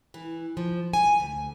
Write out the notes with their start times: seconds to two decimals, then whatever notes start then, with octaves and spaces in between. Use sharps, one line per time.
0.14 E3
0.57 F3
0.93 G#5
1.20 D2